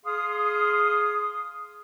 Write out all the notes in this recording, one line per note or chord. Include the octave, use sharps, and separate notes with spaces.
G#4 F5 C6 D#6